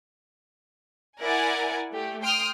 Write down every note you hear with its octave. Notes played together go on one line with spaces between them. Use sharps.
E4 A#4 D5 F#5 G#5
A3 G4
G5 C6 D#6 F6